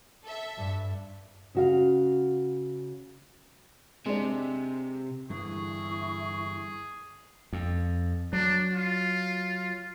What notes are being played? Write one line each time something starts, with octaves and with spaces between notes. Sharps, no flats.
A4 E5
G2
C#3 F#4 F5
C3 G#3 D4
G2 D3 E3 E4 G#4 C#6
F2
F#3 D4
F4